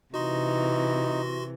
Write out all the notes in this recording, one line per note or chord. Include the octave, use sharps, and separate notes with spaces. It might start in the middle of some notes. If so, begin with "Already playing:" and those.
C3 E3 D#4 F#4 C6 A#6